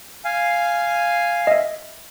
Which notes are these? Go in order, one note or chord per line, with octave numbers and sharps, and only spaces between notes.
F5 G#5
D#5 E5